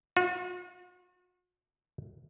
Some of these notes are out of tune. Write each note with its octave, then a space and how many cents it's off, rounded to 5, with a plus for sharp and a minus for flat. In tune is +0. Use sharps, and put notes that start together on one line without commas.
F#4 -45